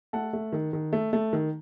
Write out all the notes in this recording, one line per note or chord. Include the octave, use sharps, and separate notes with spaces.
A3 F#5 A5
A3
D#3
D#3
A3
A3
D#3